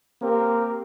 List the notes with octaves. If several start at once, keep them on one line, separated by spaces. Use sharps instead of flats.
A#3 C4 G4 A#4